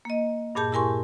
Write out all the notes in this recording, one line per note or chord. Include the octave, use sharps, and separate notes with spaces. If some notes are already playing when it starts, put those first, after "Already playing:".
A#3 D#5
G2 A#2 G#4 A5 G6
E4 G4 A#4 G#5 C6 C#6